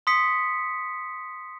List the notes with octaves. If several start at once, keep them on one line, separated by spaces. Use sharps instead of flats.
C6 D#6 B6 C#7